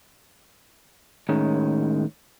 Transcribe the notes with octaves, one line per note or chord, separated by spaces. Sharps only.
A2 D#3 G#3 C#4